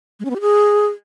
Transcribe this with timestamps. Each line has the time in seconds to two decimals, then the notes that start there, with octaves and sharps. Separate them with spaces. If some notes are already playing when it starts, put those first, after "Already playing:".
0.20 G#3
0.25 C#4
0.30 B3
0.35 G4
0.41 G#4